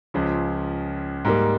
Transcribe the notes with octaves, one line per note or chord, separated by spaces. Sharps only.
C#2 C#3 F3
G#2 G3 A#3